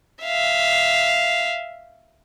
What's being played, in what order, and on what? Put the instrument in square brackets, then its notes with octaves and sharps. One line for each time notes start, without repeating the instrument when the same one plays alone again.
[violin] E5 F5